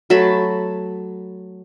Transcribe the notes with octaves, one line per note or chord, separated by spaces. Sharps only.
F#3 A3 A5 B5